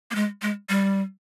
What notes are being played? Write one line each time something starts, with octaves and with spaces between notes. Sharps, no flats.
A#3
G#3
G#3
G3